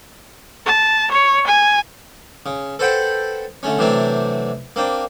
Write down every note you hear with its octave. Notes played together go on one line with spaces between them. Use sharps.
A5
C#5
G#5
C#3
A4 B4 C5 F#5 G5 B5
D3 A3 C#4
C3 E3 F#3 A3 C4 D4
A#3 C4 D4